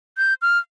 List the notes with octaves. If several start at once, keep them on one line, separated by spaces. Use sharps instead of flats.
G6
F6